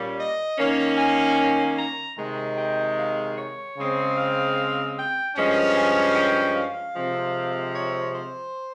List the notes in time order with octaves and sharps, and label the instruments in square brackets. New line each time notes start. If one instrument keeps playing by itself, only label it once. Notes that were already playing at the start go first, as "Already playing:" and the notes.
Already playing: [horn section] A#2 G3 A#3 C#4
D#5
D#3 A#3 C#4
G#5
A#5
C3 D#3 G#3
G5
F5
C#5
C#3 G#3 C4
F5
G5
G2 F3 G#3 C#4
G#5
G5
F5
C3 F3 G#3 C4
C#5
C5